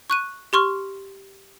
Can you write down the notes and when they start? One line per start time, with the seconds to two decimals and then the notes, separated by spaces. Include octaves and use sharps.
0.10 C#6 F#6 D#7
0.53 G4 C6 C#6 F6